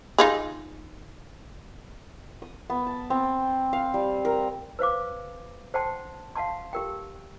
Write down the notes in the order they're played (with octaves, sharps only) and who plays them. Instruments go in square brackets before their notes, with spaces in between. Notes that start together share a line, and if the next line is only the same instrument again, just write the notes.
[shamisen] D#4 F4 G#4
[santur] D#6
B3
A5
C4
F5
G3
A#4
[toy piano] B4 C5 F5 D6
C5 F#5 G5 A5 C6
F5 F#5 A5 C6
G4 A#4 G5